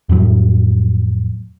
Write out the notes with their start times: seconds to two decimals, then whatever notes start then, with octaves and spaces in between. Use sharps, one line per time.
0.09 F2 A2 F#3